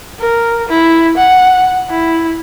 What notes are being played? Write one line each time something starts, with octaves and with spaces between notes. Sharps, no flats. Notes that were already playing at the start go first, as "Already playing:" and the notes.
A#4
E4
F#5
E4